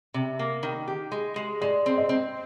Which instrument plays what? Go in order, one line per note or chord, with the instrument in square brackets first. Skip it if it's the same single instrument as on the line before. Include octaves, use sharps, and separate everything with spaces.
[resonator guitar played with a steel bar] C3
A#3
D#3
G4
G#3
G#3
[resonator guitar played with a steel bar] G#3 [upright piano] D5
[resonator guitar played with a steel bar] C4
[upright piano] D#5
[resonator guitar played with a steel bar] C4